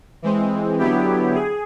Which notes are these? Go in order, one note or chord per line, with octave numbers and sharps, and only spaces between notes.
E3 G#3 C4
D3 F#3 B3 E4 G4
G#4